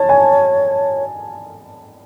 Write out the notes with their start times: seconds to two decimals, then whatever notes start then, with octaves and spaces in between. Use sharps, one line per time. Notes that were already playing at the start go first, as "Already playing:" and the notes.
Already playing: C#5 A5
0.09 G#5